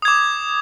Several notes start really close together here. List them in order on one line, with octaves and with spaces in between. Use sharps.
D#6 G#6 D6